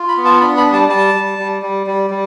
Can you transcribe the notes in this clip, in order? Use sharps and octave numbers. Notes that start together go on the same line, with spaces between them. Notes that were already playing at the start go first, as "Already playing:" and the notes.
Already playing: F4
B5
B3
A5
D4 B5
B5
G3
A5
G3 A5
G3
G3
G3
G3
G3